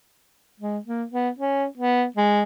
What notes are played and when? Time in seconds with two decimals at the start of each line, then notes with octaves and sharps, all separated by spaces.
0.60 G#3
0.86 A#3
1.11 B3
1.38 C#4
1.78 B3
2.16 G#3